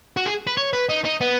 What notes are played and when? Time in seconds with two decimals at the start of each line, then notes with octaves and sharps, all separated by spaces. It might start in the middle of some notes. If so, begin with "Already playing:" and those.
0.17 F#4
0.26 G#4
0.47 B4
0.57 C#5
0.73 B4
0.89 D#4
1.05 D#4
1.21 B3